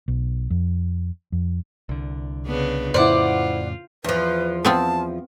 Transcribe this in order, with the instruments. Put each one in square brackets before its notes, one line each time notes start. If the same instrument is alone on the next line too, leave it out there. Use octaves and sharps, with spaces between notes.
[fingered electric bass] B1
F2
F2
[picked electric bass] C2 D3
[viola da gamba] C#3 B3 D4
[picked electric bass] F2 A2 C#3 [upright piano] E4 C5 [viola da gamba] F4 [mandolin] D5 F#5
[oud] E2 F3 [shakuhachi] B4
[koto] B3 C4 F4 [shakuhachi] A5